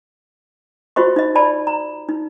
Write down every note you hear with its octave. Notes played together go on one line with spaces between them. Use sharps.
F4 F#4 C5 D#5 C#6
D#4 D#5
D5 A5 B5
A#5
D#4